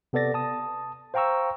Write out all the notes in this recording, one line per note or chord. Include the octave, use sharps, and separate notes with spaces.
C3 B3 A4 D5 A6 A#6
A5 D#6
C5 F5 G5 A#5 C#6 E6